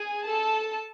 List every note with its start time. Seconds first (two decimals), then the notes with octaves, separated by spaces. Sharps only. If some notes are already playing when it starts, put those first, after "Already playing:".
Already playing: G#4 G#5
0.26 A4 A5